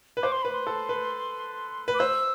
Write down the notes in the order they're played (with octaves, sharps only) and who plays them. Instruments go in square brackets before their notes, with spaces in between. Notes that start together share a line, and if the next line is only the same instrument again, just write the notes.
[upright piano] B4
[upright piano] C5 [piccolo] D6
[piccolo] C6
[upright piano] B4 [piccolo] B5
[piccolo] C6
[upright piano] A4
B4
B4
[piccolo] D6
[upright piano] C5 [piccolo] E6